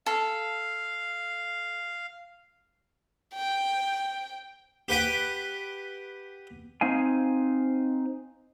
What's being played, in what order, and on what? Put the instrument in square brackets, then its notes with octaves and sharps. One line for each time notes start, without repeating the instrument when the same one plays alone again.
[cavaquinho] A4 [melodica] F5
[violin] G5
[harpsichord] G4 B4 F#5 G5
[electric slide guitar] C4 D#4 F5 G#5